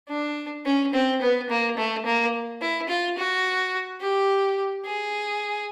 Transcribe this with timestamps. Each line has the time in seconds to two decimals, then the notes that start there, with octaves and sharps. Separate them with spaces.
0.09 D4
0.66 C#4
0.94 C4
1.22 B3
1.50 A#3
1.77 A3
2.05 A#3
2.61 E4
2.89 F4
3.17 F#4
4.01 G4
4.85 G#4